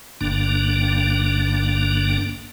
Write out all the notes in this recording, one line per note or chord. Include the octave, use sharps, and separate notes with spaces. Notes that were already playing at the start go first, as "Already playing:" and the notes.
G1 G2 D3 A#3 D4